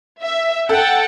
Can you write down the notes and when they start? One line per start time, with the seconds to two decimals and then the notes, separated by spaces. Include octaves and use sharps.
0.22 E5
0.69 A4 F#5 G5 A5